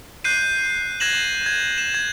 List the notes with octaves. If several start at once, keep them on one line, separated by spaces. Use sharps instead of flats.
F#6 G6 C7 D#7
F#6 G#6 A#6 E7 F#7
G#6
E7
G#6